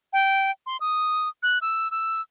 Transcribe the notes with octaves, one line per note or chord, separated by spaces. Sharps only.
G5
C6
D#6
F#6
E6
E6